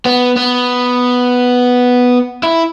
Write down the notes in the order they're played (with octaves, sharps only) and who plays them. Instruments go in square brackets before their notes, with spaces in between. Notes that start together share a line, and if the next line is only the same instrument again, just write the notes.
[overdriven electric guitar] B3
B3
E4